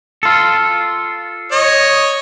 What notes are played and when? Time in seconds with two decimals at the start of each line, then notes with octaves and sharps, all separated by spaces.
0.23 F4 A4
1.52 C#5 D#5